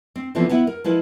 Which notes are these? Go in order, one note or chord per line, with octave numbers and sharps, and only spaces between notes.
C4
D3 E3 F3 B3 C4
B3 E4 E5 F#5
A#4
F3 G#3 E4 B4